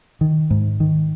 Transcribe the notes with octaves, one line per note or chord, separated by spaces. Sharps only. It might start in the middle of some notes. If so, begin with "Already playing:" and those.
D#3
G#2
D#3